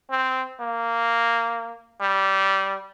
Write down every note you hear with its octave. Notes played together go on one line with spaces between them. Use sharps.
C4
A#3
G3